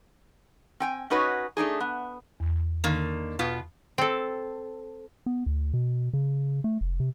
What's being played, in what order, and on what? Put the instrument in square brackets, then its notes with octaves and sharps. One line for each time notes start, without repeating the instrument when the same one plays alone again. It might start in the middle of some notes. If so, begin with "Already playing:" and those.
[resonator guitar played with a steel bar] C4 G5 G#5
C#4 D#4 F#4 B4 C#5 D#5
A3 D4 D#4 G#4
B3
[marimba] E2
[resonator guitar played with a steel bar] D3 D#3 A#3
B2 B3 F4
[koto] C4 A4
[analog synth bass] B3
D2
B2
C#3
A3
F1
C3